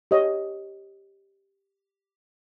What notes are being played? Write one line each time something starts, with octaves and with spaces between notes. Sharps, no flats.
G4 C#5 D#5